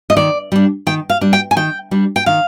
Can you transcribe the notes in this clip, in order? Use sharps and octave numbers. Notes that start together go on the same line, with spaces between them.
D#5
D#3 D5
G3 D4
D#3 G5
F5
G3 D4
G5
G#5
D#3 G5
G3 D4
G5
D#3 F5